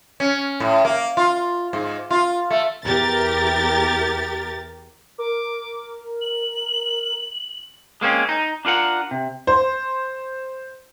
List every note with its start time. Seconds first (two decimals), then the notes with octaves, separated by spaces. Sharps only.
0.20 C#4
0.60 A2
0.85 A#3
1.17 F4
1.73 G#2
2.11 F4
2.50 A3
2.85 E2 G4 A#4 A6
5.18 A#4 D6
6.21 F#7
8.01 G#3 A#3 C4 C#4
8.29 D#4
8.65 D4 F4 A#4 F#5
9.11 C3
9.47 C5